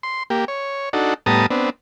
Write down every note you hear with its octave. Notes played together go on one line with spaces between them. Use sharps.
C6
A#3 G4
C#5
D4 D#4 F#4 A4
A2 G3 B3 A5 A#5 D#6
B3 C4 D4